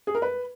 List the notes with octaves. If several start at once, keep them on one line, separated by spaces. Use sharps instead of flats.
G#4
A#4
B4